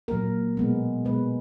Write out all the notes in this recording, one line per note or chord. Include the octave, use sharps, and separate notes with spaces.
A#2 F#3 A#3 A#4
B2 G#3 B3
B2 G#3 B3 B4